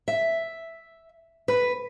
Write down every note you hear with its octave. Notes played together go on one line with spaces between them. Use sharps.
E5
B4